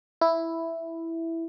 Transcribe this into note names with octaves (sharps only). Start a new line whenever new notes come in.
E4